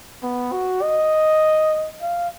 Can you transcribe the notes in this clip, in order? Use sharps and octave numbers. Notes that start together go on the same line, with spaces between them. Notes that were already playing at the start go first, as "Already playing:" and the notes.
B3
F#4
D#5
F5